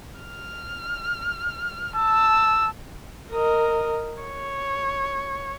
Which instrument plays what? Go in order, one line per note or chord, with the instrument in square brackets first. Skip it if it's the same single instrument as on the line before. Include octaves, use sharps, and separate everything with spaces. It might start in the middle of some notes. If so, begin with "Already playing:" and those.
[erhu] F6
[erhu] A5 [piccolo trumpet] E6
[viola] A#4 D#5
C#5